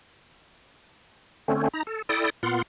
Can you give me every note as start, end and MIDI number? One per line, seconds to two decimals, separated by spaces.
1.48 1.68 50
1.48 1.68 57
1.48 1.68 60
1.48 1.68 61
1.73 1.83 63
1.73 1.83 82
1.87 2.02 69
2.09 2.30 64
2.09 2.30 69
2.09 2.30 74
2.09 2.30 79
2.09 2.30 87
2.43 2.62 46
2.43 2.62 59
2.43 2.62 65
2.43 2.62 78
2.43 2.62 84
2.43 2.62 89